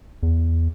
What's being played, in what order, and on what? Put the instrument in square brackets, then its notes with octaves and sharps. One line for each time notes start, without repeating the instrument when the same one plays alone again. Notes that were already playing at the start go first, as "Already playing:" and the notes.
[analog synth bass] E2